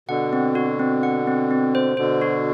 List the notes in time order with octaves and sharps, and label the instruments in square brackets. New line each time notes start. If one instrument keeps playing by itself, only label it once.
[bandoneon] B2 D3 [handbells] F#5
[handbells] C4
F#4
C4
F#5
C4
C4
C5
[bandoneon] B2 D3 [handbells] C5
[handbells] F#4